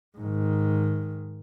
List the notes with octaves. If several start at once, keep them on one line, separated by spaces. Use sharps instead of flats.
G#2 D#3